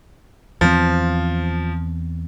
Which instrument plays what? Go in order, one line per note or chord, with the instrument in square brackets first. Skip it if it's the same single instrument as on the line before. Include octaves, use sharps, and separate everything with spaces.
[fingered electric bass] E2 B3 C4 [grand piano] F3